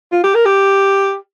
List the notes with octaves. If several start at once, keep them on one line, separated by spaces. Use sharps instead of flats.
F4
G4
A#4
G4